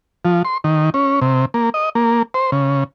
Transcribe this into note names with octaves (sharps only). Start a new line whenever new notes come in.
F3
C6
D#3
C#4
C3
A#3
D#5
A#3
C5
C#3